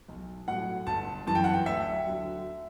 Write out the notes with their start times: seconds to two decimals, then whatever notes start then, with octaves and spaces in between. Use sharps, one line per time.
0.08 B1
0.48 A2 F#3 F#5
0.87 G1 A5
1.27 F#2 E3 A5
1.35 G5
1.44 F#5
1.54 G5
1.66 D2 E5
2.06 D3 F#3